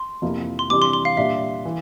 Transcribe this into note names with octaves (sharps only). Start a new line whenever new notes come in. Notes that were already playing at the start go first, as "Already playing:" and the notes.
Already playing: C6
F2 C3 F3 A#3 E4
C6
C3 E3 G3 D4 D6
C6
C6
F5
A#2 G3 D4 E5
E3